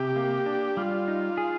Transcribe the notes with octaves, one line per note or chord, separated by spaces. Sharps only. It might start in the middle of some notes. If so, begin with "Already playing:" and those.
Already playing: C3 G4
A#3
D4
G3 F4
D#4
G#4